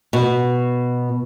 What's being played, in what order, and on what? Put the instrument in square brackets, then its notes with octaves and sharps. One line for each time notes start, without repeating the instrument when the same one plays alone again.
[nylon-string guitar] B2